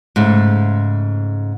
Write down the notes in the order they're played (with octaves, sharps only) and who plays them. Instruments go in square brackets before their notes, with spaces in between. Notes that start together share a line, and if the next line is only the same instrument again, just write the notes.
[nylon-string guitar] G#2 C#3 A3